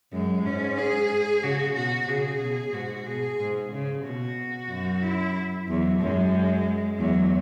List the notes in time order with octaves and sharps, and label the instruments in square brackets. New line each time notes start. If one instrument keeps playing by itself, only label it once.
[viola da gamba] F#2 [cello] G#3
[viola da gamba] G#2 [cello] C#4
[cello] G#4
[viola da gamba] C#3 [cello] F#4
[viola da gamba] B2 [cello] F#4
[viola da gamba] C#3 [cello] G#4
[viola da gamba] B2
[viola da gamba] G#2 [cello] F#4
[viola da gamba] B2 [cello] G#4
[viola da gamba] G#2
C#3
[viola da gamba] B2 [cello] F#4
[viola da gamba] F#2
[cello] E4
[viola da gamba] E2 [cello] F#3
[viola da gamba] F#2 [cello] G#3
[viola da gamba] E2 [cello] F#3